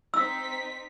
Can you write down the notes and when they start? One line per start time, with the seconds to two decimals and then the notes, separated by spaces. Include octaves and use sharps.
0.14 C4 D#4 E6 B6